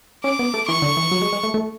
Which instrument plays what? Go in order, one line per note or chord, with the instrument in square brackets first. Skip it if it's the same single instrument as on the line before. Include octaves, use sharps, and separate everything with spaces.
[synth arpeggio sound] C#4 [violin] D6
[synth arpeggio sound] B3
A3
[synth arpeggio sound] E3 [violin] C#6
[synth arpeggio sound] D3
E3
F#3
G#3
G#3
A3
A3